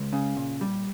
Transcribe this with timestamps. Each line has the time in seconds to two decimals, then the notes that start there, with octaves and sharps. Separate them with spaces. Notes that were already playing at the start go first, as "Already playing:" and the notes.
Already playing: C#2
0.13 C#3
0.37 A#2
0.61 G3